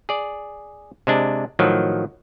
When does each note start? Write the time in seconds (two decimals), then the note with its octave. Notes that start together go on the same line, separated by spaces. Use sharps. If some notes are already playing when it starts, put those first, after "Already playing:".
0.09 G#4 D5
1.07 C3 G#3 D4
1.59 A2 D#3 F3 F#3